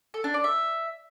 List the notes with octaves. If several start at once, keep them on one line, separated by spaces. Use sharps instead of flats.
A4
D4
D5
E5